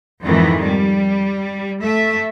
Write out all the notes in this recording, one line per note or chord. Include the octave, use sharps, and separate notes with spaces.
F2 G#2 D#3 E3
G3
A3 E5